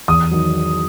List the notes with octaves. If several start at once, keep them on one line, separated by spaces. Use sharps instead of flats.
E2 D#6
D#3 F#3